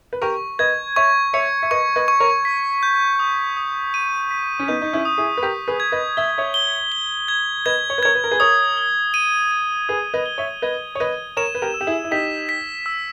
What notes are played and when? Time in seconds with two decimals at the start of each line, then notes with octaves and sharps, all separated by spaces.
0.13 B4
0.22 G4 A#4 C#6
0.59 B4 D#5 G#6
0.96 C#5 E5 C#6
1.33 C#5 E5 C#7
1.62 E5
1.71 B4 D#5 C#6
1.96 B4 D#5
2.08 C#6
2.20 A#4 C#5
2.45 B6
2.83 G6
3.19 D#6
3.57 D#6
3.94 D#7
4.31 B6
4.59 C#4
4.68 B3 D#4 G6
4.82 D#4
4.93 C#4 E4
5.05 D#6
5.18 E4 G#4
5.37 B4
5.42 G4 A#4 B6
5.68 G#4 B4
5.80 G#6
5.92 B4 D#5
6.17 E5 G7
6.38 C#5 E5
6.54 G7
6.92 G7
7.28 G#6
7.66 B4 D#5 G#6
7.90 C#5
7.98 B4
8.03 A#4 C#5 G#6
8.15 B4
8.24 A#4
8.31 G#4 B4
8.40 A#4 C#5 D#6
8.77 G7
9.14 D#7
9.51 D#7
9.89 G#4 B4 D#6
10.14 B4 D#5
10.26 G7
10.38 C#5 E5
10.62 B4 D#5 G#6
10.95 C#5
11.00 B4 D#5 D#7
11.37 A#4 C#5 E7
11.55 B4
11.62 G4 A#4
11.74 E6
11.81 G4
11.87 E4 G#4
12.04 E4
12.11 D#4 G4 B6
12.49 B6
12.86 E6